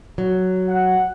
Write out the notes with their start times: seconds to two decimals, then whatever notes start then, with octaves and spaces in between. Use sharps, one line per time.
0.18 F#3
0.68 F#5